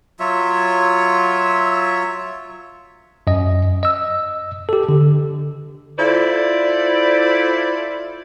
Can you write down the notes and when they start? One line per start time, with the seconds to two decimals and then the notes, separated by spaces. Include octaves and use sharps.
0.20 F#3 F4 C#5 E5
3.27 F#2 D#5
3.83 D#5 E6
4.69 G4 A4
4.89 D3
5.97 E4 F4 A4 C5 D5